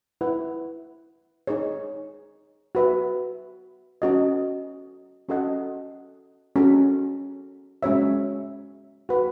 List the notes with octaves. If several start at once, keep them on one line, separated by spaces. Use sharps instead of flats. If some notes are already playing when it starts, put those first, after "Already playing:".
E4 B4 F#5
D#4 G#4 C#5
F#4 B4 E5
C#4 F#4 A4 D#5
C#4 F#4 A4 D#5 F#5
C#4 F#4 A4
G#3 C#4 F#4 C#5 E5
F#4 B4 F#5